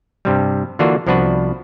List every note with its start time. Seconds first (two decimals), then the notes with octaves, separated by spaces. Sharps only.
0.25 G2 C3 G3
0.79 D3 E3 A#3 D4 F4 F#4
1.07 C2 F3 B3 D4 F#4 B4